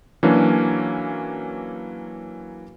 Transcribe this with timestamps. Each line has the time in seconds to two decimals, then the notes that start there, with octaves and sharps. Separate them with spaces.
0.23 E3 F#3 A#3 C#4 D4